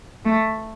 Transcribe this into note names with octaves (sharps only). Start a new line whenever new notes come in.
A3